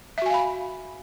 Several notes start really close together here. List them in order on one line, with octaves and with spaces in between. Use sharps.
E5 F#4 G#5 F5 B5